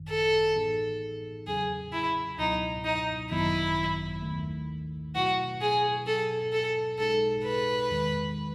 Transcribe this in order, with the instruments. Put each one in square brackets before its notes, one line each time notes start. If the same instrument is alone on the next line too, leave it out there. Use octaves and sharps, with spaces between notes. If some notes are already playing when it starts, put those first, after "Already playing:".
Already playing: [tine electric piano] G#1 F#2 D#3
[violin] A4
[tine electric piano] A2 E3 B3 D#4 G#4
[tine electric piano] E2 C#3 F#3 C#4 [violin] G#4
[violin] E4
[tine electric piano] C#2 B2 F#3 B3 E4 [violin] D#4
[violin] D#4
[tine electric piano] G#1 F#2 D#3 F#3 B3 [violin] E4
[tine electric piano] D#2 D#3 A3
[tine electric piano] B2 F#3 A3 E4 B4 [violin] F#4
[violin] G#4
[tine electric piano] B2 F#3 C#4 [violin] A4
[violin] A4
[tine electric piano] B1 B2 G#3 D#4 G#4 [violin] A4
[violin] B4
[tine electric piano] E2 D#3 G#3